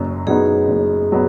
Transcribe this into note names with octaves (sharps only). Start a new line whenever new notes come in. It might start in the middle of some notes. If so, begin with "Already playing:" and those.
Already playing: F#1 F#2 F#3
F#2 F#3 B3 D#4 G#4
F#1
F#3 B3